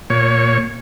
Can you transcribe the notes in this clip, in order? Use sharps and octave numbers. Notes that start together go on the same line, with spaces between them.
A#2 C#5